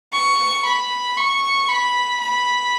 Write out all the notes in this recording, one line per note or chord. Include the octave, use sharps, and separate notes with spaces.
C#6
B5
C#6
B5
B5